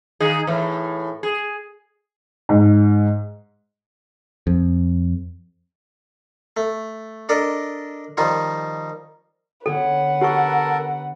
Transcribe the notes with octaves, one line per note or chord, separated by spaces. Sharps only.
D#3 D#4 G#4
A2 E3
G#4
G#2
F2
A3
D4 A4 A#4 D5 D#5
D#3 F3 G3 D#4 F4
D3 B3 C#4 A4 B4 F#5
G4 A4 A#4 C#6